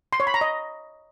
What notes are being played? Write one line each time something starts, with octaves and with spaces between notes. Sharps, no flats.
C6
C#5
B5
A#5
D#5